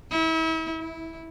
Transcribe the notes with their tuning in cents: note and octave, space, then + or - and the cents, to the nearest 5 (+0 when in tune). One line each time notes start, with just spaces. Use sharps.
E4 -35
E4 -10